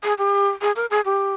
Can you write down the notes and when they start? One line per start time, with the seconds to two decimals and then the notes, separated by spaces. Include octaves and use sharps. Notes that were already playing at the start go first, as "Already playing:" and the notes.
0.04 G#4
0.18 G4
0.62 G#4
0.76 A#4
0.91 G#4
1.05 G4